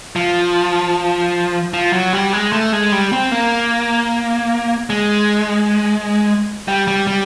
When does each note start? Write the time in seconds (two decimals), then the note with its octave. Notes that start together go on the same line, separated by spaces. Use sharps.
0.16 F3
1.74 F3
1.93 F#3
2.13 G3
2.33 G#3
2.53 A3
2.73 G#3
2.92 G3
3.12 C4
3.31 A#3
4.90 G#3
6.68 G3
6.88 G3
7.07 G3